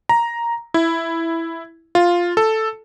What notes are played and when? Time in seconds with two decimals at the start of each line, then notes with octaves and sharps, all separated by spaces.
0.09 A#5
0.74 E4
1.95 F4
2.37 A4